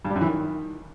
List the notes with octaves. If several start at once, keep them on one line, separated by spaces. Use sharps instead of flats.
G2
G3
F#2
E3
D#3